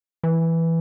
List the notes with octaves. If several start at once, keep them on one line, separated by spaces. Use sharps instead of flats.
E3